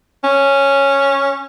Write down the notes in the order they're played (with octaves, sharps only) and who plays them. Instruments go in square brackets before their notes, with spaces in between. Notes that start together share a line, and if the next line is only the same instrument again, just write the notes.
[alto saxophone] C#4